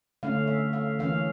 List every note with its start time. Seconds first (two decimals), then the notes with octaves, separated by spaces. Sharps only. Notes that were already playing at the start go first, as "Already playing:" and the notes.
0.23 D3 A3 C#4 F5
0.47 E5
0.73 F5
0.99 E3 A#3 C#4 F5